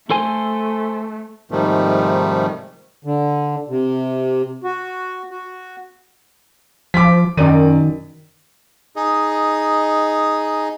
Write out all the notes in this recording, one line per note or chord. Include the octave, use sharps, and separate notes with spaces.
A3 A4 C5 G#5
G#2 C3 D#3 F3 G3 A3
D3
C3
F#4
F#4
F3 D6 B6
F#2 D#3 D5 D#7
D#4 G#4 D#5